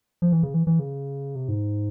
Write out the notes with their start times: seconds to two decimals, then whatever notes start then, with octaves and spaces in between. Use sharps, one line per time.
0.22 F3
0.32 E3
0.43 C#3
0.54 E3
0.67 E3
0.79 C#3
1.35 C3
1.48 G#2